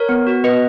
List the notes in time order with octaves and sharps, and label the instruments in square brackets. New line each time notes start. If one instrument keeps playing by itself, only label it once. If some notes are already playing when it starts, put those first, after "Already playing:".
Already playing: [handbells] A#4 C#5
B3
F#4
B3 B4 D#5